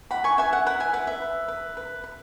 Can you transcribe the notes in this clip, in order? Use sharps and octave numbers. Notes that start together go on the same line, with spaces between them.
E4 F#5 B5
G#5 C#6
B4 E5 G#5
F#5
E4 F#5 B5
E5 G#5
B4 F#5
E5
B4
B4
B4
B4